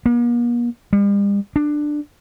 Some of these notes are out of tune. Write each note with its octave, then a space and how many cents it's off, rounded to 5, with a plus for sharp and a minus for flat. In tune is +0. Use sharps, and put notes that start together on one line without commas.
A#3 +45
G3 +45
D4 +15